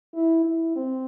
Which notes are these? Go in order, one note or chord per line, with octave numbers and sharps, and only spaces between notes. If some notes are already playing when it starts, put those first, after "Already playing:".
E4
E4
C4